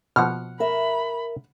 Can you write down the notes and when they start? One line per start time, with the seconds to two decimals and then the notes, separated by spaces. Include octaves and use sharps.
0.16 B2 F3 F#5 F6
0.60 A#4 E5 B5